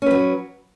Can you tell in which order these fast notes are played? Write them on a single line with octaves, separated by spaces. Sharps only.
C#4 B4 F#3